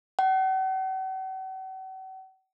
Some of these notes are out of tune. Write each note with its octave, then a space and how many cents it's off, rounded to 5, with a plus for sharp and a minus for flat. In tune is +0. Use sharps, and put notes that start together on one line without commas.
F#5 +45